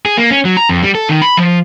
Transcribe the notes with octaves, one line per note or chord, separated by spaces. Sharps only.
G#4
A#3
C#4
F#3
A#5
F2
G3
A4
D#3
B5
F3